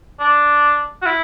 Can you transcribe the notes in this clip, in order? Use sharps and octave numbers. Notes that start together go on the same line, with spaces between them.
D4
F#4
E4